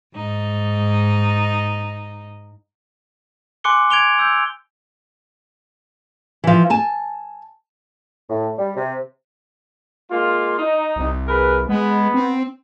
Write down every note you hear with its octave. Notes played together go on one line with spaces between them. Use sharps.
G#2 D#4
G#5 C6 D6 F#6 C#7 G7
G#6 D7 F7 G7
E6 G6
E3 F3
G#5 A5
A2
G3
C3
G#3 A#3 F4
D#4
C2
G#4 A#4 B4
G#3 B3
C4